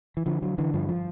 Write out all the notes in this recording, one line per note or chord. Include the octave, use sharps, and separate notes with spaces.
E3
D3 F3
D3 F#3
D3 E3
G2 F3
F3